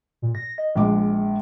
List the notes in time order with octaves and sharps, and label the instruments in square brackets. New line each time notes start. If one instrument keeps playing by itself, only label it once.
[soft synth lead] A#2
A#6
D#5
[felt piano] A#1 G#3 D6 [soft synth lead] F3